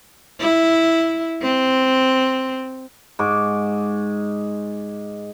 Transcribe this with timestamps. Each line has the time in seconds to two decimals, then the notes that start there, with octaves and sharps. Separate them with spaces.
0.41 E4
1.42 C4
3.19 G#2 C#6 D6